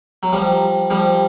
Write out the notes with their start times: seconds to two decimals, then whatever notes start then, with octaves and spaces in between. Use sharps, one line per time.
0.23 F#3
0.33 F3 G3
0.90 F3 G3